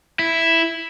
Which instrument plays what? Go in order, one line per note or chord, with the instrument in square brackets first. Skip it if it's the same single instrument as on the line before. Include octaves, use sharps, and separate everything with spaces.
[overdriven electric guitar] E4